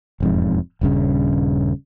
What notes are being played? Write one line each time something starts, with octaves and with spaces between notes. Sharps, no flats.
E1 F2 G#2
D#1 G2 C#3